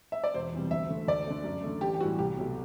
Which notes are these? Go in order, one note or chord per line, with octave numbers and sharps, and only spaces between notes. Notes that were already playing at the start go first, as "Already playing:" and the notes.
E5
D5
E1 C5
E2 C3 G3
D2 E5
D3 A3
D2 D5
D3 A3
F#2
D3 A3
A1 G4
G4
A2 E3 G3 F#4
C2 G4
B2 F#3 A3